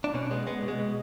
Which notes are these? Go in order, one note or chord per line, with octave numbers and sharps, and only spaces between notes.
D4
B2 C#4
G#3 B3
G#3 B3
B2
G#3
B2